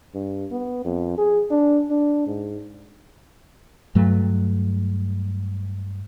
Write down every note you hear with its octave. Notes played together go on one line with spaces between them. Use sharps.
G2
B3
F2
G#4
D4
D4
G#2
G2 F#3 A3